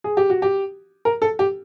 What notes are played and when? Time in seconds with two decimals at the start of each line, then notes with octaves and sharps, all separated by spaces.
0.04 G#4
0.17 G4
0.30 F#4
0.42 G4
1.05 A#4
1.22 A4
1.39 G4